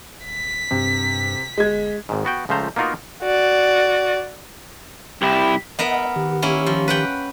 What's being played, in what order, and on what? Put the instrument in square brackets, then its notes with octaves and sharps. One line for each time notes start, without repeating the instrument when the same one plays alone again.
[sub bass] D#1 [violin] B6
[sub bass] G2 [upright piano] C3
[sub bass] G1 [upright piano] G#3 G#6
[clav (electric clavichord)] G#1 G#2
B3 F#4 G5
C#2 F3 A3 C5 A#5
A#3 B3 D#4 F4 F#4 A#4
[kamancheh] F#4 D5
[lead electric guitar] C2 E4 [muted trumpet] G4
[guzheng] B3 A#4 E5 [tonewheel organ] D#5 F#5
[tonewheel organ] D#3 G4
[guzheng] A#3 C#4 E4
F3
B4 F#5 G5